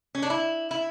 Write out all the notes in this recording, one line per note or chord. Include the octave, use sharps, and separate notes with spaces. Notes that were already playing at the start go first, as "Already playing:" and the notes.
C#4
D4
E4
E4